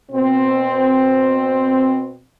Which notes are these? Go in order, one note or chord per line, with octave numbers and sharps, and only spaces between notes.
B2 C4